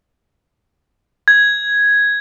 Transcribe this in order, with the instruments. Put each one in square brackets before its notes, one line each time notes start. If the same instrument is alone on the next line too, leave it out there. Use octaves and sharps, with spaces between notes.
[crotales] G#6